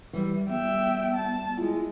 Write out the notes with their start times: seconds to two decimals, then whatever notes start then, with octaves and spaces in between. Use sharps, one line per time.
0.13 E3 G3
0.49 G3 B3 E5 G5
1.15 A5
1.57 G#3 E4 F4